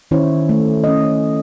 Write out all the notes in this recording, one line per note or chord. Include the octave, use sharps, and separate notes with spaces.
D#3 C#4 E4 C5 C#5
A3
C#4 D#5